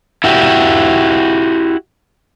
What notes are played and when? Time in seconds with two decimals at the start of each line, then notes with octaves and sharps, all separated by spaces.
0.24 E4 F#4 G4